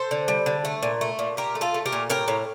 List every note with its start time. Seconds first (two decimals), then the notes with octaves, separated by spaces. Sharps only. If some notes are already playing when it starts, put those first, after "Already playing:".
Already playing: A4 C5
0.11 D3
0.28 G3
0.46 D3
0.65 A3
0.83 A#2
1.01 A3
1.19 A#2
1.37 A#2 G4 A#4
1.55 A3
1.61 F4 A4
1.74 A3
1.86 G4 A#4
1.92 A#2
2.10 A2 G4 A#4
2.28 A2